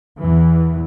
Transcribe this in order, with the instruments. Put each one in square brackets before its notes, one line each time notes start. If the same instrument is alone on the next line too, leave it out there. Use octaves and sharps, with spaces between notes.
[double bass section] E2 E3